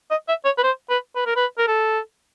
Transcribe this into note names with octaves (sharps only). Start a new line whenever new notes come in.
D#5
E5
C#5
B4
C5
B4
B4
A#4
B4
A#4
A4